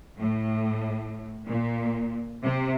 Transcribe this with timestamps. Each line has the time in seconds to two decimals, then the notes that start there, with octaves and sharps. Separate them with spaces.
0.20 A2
1.48 A#2
2.44 C3